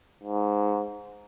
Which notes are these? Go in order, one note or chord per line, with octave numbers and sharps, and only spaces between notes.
G#2